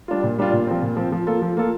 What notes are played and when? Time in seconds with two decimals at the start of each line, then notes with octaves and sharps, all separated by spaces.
0.08 G3 D4 F4
0.23 A#2
0.38 G3 D4 F4
0.53 A#2
0.67 F3 C4
0.82 A#2
0.97 F3 C4
1.12 F3
1.27 A#3 F4 A4
1.42 F3
1.57 A#3 F4 A4